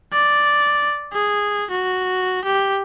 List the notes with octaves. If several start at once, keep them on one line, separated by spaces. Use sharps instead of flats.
D5
G#4
F#4
G4